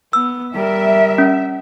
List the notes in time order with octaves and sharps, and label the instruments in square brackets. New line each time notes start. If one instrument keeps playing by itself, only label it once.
[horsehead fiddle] B3 [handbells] E6
[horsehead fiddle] G3 A#4 [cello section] E5
[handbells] C#4